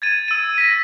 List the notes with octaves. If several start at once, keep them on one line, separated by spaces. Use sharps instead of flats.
G#6 A6 D#7
E6 D#7
A#6 B6